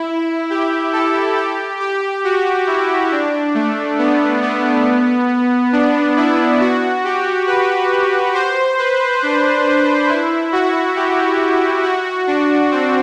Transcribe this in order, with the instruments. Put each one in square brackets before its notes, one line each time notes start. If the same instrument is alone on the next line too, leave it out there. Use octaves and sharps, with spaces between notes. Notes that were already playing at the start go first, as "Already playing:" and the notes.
Already playing: [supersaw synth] E4
G4
A4
G4
G4
F#4
E4
D4
A3
B3
B3
D4
E4
F#4
G4
B4
C5
B4
D4
D4
E4
F#4
G4
F#4
D4
C4